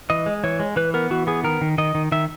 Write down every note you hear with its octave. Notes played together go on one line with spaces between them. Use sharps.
E3 D#5
G#3
E3 C#5
G#3
E3 B4
B3 A#4
E3 F#4
B3 G#4
D#3 A#4
D#3
D#3 D#5
D#3
D#3 E5